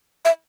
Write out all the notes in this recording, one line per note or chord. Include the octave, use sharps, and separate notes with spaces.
E5